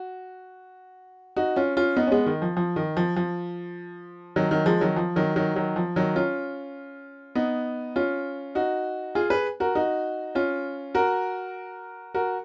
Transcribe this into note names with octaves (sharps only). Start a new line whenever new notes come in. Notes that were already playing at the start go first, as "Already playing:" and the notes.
Already playing: F#4
D#4 F#4
C#4 F4
C#4 F4
B3 D#4
C#4
G#3 B3
D#3
F3
F3
D#3
F3
F3
D#3 F#3
D#3 F#3
F3 G#3
D#3 F#3
F3
D#3 F#3
D#3 F#3
D#3 F#3
F3
D#3 F#3
C#4 F4
B3 D#4
C#4 F4
D#4 F#4
F4 G#4
G#4 B4
F#4 A#4
D#4 F#4
C#4 F4
F#4 A#4
F#4 A#4